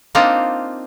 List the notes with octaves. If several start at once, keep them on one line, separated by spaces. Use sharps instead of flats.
A#3 C4 D4 D#4 F4